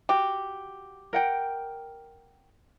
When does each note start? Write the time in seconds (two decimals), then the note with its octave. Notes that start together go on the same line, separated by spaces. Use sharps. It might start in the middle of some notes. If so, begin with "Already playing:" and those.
0.09 F#4 G4
1.13 A#4 F#5 G5